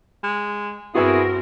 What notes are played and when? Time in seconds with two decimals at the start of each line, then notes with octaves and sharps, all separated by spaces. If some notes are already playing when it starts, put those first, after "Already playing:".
0.23 G#3
0.95 G2 B3 C4 E4 F#4 G#4 A#4 E6